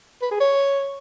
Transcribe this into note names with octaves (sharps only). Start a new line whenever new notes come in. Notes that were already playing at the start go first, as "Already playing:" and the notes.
B4
G#4
C#5